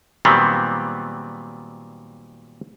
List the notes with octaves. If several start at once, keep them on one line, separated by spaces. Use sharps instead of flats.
A#2 D#3 F#3 G3 B3 C4